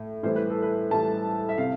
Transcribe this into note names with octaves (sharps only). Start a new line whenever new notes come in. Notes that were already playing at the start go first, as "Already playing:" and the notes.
Already playing: A2
A2 E3 G3 C5
B4
A4
B4
A2 E3 G3 A5
E5
C3 F5